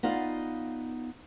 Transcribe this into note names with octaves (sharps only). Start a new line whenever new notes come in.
B3 D#4 F4 D5 F5